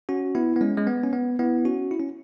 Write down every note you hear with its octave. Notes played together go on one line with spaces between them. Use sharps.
C#4 F#4
B3 E4
B3
G#3 C#4
G#3
B3
C#4
B3
B3 E4
C#4 F#4
E4
C#4